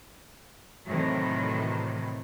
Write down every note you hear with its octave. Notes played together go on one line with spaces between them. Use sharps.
A2 C3 D#3 E3 F#3